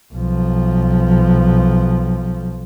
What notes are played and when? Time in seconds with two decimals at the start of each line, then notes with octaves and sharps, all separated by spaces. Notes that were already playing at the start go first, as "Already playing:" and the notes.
0.13 B1 F3